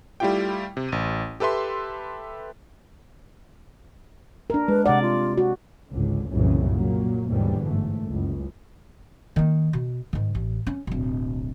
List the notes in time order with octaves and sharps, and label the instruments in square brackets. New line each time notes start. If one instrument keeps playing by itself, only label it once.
[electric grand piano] G3 A3 E4 F4 G4 G5
C3
A1 D#7
G4 A4 B4 E5 C6
[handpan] D4 A#4
[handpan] G#3 [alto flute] B4
[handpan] C3 D5 [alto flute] F#5
[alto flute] F4
[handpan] F#4
[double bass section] G#1 C#2 D3
C2 F#2 A#2 C#3 E3
A#2 F#3 A#3
D#2 G#2 B2 D3 E3 G3
G1 G#2 A3
F#1 C#2
[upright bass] D#3 A#3
B2
G#2 D#3
A1
C#4
D1 B1